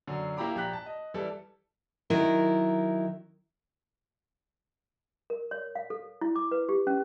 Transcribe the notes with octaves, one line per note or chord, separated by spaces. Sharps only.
F#2 D3
A#3 E4 G4 A#5 B5 D6
A#1 G4 A#5 F#6 B6
A5
D#5
E3 G3 E4 A4
D#3 F#3 E4 A#4
A#4
C#5
F5
A4
E4
D6
B4
G4
C#4